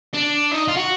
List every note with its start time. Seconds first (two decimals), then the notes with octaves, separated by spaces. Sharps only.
0.13 D4
0.51 D#4
0.68 F4
0.77 F#4